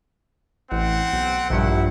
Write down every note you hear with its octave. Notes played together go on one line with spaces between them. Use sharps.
A1 C4 F#5
B1
A#1 G2 E4 F#5